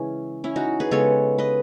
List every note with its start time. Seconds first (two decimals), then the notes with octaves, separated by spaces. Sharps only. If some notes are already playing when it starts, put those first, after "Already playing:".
Already playing: C#3 E3 G#3 C#4 E4
0.44 C#4 E4
0.56 D#4 F#4
0.80 G#4 B4
0.91 C#3 G#3 B3 A4 C#5
1.38 B4 D#5